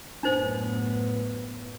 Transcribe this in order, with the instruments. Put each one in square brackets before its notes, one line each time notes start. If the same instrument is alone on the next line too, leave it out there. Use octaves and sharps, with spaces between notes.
[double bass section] F#2 A2 B3 [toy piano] D4 D#4 C5